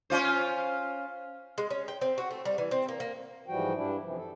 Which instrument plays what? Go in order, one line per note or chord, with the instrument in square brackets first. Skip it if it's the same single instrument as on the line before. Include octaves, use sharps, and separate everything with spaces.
[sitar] C#4 F4 C5
[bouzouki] G#3
C#4
G5
C4
F#4
A3
G3
E3
C4
A#3
A#3
[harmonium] G#2 E3 F3 G3 F#4 G5
G2 D4 E4
F#2 C3 E3 F3
A4